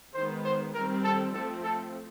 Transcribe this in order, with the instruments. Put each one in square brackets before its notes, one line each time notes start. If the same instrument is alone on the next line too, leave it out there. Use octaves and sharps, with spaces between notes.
[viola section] D#3 G#3 B3 [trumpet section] C5
[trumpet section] C5
[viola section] D#3 G3 C4 [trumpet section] A#4
[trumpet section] A4
[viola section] F3 A3 C4 [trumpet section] A4
[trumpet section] A4